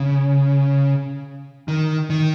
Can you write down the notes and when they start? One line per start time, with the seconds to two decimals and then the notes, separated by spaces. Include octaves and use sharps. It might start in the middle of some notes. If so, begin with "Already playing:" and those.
Already playing: C#3
1.68 D#3
2.10 D#3